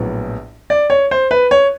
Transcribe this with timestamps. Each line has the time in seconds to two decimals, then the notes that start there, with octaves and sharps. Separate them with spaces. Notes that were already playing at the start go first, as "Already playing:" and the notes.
Already playing: A#1 A2 F#3 B3
0.70 D5
0.90 C#5
1.11 C5
1.31 B4
1.51 C#5